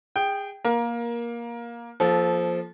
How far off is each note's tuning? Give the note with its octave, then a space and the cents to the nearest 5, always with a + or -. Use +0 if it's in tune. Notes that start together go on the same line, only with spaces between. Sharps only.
G#4 -25 G5 +0
A#3 +15 A#4 +20
F3 +0 A#3 +25 A4 -25